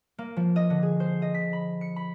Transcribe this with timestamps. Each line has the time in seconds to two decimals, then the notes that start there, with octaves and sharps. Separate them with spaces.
0.18 A#3
0.37 F3
0.56 D#5
0.70 D3
0.83 G#4
1.00 C5
1.22 D#5
1.34 B6
1.53 B5
1.81 C#7
1.96 B5